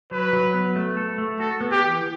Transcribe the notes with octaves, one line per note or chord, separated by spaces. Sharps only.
F#3 B4
F#3
B3
A3
A4
A3
F#4 A4
B3
G4
E3